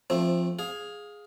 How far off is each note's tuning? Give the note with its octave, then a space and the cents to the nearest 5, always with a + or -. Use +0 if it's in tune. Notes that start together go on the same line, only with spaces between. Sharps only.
F3 +0 A3 +0 C4 +15
G#4 +0 F5 +20